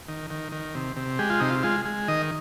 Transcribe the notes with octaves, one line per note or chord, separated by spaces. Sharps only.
D#3
D#3
D#3
C3
C3
G#3 G4
F4
C3 D#4
F4
G#3 F4
G#3
D#3 D#5